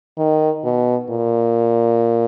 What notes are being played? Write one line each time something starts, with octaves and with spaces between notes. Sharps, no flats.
D#3
B2
A#2